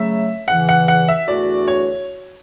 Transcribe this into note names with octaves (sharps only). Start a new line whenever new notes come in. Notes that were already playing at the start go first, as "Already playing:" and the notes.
Already playing: C#3 F#3 A3 E5
E2 C#3 E3 F#5
F#5
F#5
E5
E2 D3 A3 D4 F#4 D5
C#5